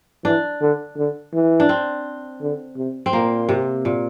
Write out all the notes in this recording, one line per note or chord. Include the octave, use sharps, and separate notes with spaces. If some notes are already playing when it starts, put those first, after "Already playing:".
E3 D4
D3
D3
E3
D4
C4
D3
C3
C4
A#2 A#3
C3
A#2